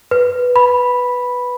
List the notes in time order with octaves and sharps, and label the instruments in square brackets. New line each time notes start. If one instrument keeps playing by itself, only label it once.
[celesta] B4
B5